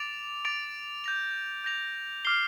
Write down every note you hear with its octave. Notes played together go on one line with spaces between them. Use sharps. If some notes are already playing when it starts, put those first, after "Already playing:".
Already playing: D6 A6 D7 F7
D6 A6 D7 F7
G6 A#6 F7
G6 A#6 F7
D6 F6 C7 G7